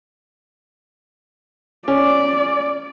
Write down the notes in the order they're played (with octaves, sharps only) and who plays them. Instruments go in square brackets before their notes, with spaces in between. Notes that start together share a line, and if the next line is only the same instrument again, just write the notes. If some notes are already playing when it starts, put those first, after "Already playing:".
[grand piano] C#4 [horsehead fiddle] D5